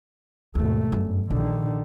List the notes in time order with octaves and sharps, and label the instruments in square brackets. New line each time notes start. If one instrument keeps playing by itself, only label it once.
[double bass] G#1 A3 [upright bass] D#2 B2
[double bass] G1 [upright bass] F#2
[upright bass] A#1 [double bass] D3 D#3